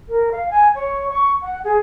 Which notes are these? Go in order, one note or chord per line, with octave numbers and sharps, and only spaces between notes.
A#4
F5
G#5
C#5
C#6
F#5
G#4